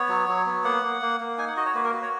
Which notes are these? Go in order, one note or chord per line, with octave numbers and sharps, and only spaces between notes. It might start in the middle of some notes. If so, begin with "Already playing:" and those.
Already playing: B3 C#5
F#3
F#3
B3
A#3 F#5
A#3
A#3
A#3
D#4 G#5
F#5
F#4 D#5
C#5
A#3 B4
A#4
F#4 B4
C#5